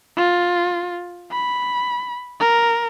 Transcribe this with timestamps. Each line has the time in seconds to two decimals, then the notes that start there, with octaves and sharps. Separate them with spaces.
0.17 F4
1.31 B5
2.40 A#4